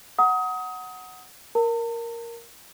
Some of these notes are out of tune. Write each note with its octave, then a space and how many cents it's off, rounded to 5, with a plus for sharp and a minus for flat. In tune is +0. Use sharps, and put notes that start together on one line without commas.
F#5 +0 A#5 +0 D#6 +25
A#4 +0 A5 +45